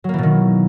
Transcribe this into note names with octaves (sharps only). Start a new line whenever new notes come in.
B2 D#3 E3 F#3 A#3